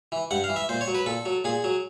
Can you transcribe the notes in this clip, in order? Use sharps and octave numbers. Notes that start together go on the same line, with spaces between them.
E3
G2 F#5
F5
E3
E5
A#2 C5
C#5
F#3
B4
A#2 A4
F#3
A#2 G#4
F#3